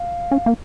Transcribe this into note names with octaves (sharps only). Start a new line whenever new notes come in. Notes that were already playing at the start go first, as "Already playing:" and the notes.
Already playing: F5
C#4
A#3